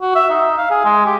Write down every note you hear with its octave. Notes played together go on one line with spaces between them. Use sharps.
F#4
E5
D#4
F5
G#4
G#3
G4